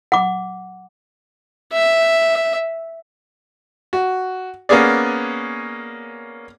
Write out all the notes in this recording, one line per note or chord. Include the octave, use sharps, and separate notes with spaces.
F#5 D6
E5
F#4
A#3 B3 C#4 G#4 D5